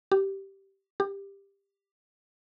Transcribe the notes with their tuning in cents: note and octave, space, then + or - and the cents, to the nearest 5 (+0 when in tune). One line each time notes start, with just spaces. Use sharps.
G4 -10
G4 +15